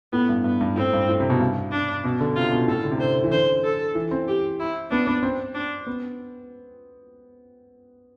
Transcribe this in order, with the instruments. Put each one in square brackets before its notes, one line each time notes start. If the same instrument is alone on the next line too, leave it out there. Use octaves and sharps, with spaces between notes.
[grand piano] A2 [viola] B3
[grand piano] G2
[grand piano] G2 [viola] B3
[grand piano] G2
[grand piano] A2 [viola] C4
[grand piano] G2
A2
C3
B2
G2
[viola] D4
[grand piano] B2
D3
[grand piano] C3 [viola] F4
[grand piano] B2
[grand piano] A2 [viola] A4
[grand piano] D3
C3
[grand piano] D3 [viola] C5
[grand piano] E3
[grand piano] D3 [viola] C5
[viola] A4
[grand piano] E3
C4
[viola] G4
E4
[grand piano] B3 [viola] D4
[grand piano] B3
C4
[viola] D4
[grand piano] B3